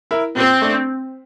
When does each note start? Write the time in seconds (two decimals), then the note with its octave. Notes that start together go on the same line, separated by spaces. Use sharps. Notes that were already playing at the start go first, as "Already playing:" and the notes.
0.11 E4 A#4
0.36 A#2 C4
0.62 A3 D4